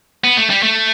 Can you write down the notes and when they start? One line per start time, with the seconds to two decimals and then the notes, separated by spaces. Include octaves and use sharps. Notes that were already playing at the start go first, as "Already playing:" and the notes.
0.24 B3
0.37 A3
0.50 G3
0.63 A3